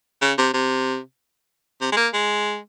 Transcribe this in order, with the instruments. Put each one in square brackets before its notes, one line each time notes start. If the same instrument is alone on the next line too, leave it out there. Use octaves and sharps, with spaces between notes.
[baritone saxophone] C#3
C3
C3
C3
G#3
A#3
G#3